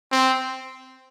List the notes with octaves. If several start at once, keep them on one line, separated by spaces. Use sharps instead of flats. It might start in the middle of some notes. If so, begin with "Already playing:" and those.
C4